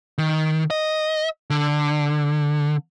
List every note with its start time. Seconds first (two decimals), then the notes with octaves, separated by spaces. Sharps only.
0.18 D#3
0.70 D#5
1.50 D3